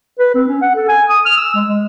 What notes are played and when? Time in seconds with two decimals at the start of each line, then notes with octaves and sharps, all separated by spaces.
0.19 B4
0.35 C4
0.48 C#4
0.61 F#5
0.76 A4
0.88 G#5
1.10 D#6
1.26 F6
1.37 E6
1.55 G#3
1.68 G#3